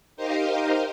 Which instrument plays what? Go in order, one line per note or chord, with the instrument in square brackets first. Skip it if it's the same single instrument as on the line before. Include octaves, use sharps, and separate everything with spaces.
[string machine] D#4 G4 A#4 C5 D#5 F5